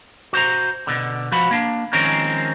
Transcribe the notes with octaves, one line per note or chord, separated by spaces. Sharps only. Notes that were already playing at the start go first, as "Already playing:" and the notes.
F#4 C5 A#5
B2 D3
F3 F#4 B5
A#3 D4
D#3 F3 G#3 C4 C#4 A#4